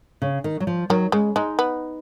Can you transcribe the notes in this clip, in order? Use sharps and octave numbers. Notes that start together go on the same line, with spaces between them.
C#3
D#3
F#3
F3
D#3 F#3
C#3 G#3
G#3 D#4
B3